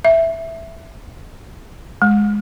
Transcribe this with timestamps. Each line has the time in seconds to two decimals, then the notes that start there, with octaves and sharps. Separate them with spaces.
0.05 E5
2.02 G#3